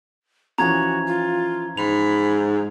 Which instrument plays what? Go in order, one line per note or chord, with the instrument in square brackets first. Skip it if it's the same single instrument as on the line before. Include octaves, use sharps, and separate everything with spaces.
[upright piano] E3 F3 C#4 [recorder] F#4 [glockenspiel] A#5 G#6
[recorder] F4
[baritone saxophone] G#2 [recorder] B5 [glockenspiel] F7